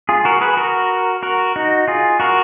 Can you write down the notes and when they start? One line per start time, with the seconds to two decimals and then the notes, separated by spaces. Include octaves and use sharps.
0.09 F4 G#4
0.25 F#4 A#4
0.41 G#4 B4
0.57 F#4 A#4
1.23 F#4 A#4
1.56 D#4 F#4
1.88 F4 G#4
2.20 F#4 A#4